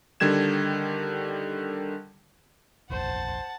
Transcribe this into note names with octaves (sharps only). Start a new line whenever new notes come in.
D3 D#3 G3 G#6 E7
F1 A#1 D#2 C5 F#5 A5